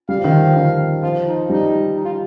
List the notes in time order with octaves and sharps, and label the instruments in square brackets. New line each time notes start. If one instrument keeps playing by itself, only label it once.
[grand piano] G3 [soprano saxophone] F5
[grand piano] F3
D#3
F3
D#3
[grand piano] F3 [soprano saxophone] F4
[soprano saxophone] D#4
[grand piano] G3 [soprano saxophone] D#4
[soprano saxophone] D#4
F4